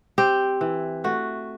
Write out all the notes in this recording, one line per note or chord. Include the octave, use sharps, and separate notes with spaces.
C4 G4
E3
A3 F#4